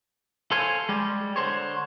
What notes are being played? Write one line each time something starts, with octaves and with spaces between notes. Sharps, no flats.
A4 C5 C#5 F5 G#5
G3 G#3
D3 A#4 C5 C#5